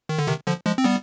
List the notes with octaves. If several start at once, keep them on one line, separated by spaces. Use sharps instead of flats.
D#3
D3
C3 D#3
D3 F3
F3 G#3
C4
G3 B3